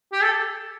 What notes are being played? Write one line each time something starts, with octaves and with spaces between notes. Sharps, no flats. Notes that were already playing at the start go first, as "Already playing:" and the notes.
G4
A4